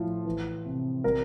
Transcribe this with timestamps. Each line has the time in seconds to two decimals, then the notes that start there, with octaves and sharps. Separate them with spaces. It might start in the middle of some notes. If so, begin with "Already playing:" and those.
Already playing: A2 F3
0.25 E3
0.65 C3
1.04 G3 A#4